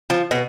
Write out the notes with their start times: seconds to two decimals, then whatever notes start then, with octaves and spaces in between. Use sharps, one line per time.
0.10 F3
0.31 B2